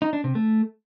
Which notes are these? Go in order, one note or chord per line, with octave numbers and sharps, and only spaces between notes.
D#4
D4
C3
A3